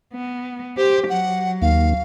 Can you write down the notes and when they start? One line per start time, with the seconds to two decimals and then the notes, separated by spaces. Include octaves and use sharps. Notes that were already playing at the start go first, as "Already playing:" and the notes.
0.14 B3
0.77 G4 C5
1.09 F#3 F#5
1.62 D#2 F5